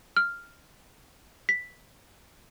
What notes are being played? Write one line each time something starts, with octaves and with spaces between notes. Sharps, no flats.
F6
B6